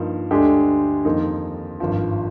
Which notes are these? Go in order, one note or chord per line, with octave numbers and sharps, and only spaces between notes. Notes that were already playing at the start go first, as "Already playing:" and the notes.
Already playing: G2 F3 A#3 D#4
D2 D3 G#3 D4 G4
F2 D#3 A#3 D#4
G#1 G2 F3